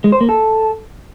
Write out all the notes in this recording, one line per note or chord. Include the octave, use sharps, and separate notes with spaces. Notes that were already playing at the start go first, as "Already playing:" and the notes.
G#3
C5
A#3
A4